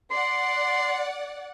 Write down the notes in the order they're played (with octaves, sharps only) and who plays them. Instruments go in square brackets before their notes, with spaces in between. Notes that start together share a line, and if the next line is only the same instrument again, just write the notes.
[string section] D5 F#5 [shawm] C6